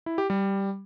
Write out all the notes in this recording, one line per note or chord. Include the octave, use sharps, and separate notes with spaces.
E4
G4
G3